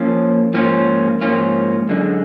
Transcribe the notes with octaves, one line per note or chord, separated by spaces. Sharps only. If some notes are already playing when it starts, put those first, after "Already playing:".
Already playing: F3 A#3 C#4 F4
G#2 F3 A#3 C#4 F4
G#2 F3 A#3 C#4 F4
F#2 D3 G#3